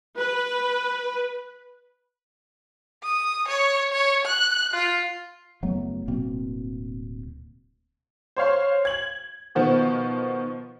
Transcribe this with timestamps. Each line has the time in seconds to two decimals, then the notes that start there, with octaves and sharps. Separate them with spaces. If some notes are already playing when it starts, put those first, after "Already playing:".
0.17 B4
3.03 D#6
3.48 C#5
3.92 C#5
4.26 F#6
4.74 F4
5.63 F#1 F#3 A3 B3
6.08 D1 B2 A#3 C4
8.37 C5 C#5 F5 C6
8.85 G#6 F#7
9.55 B2 D#3 F3 B3